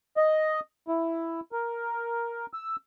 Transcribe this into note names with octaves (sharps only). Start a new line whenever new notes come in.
D#5
E4
A#4
E6